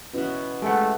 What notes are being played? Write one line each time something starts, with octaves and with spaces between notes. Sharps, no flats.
B2 B3 C#4 E4 F#4
G#3 A3 G4 B4 F#5